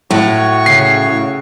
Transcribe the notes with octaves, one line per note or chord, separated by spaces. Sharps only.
A2 F#4 C#5 C#6
C#3 C7